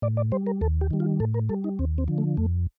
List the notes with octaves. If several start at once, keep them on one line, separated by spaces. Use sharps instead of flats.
A2 D5
D5
G3 C5
A#4
D#2 A4
G4
D#3 G3
F4
A2 A4
A#4
G3 A4
D#4
D#2 C4
C4
D3 F3
A3
F2 A3